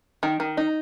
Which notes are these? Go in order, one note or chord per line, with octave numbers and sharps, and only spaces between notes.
D#3
D#3
D#4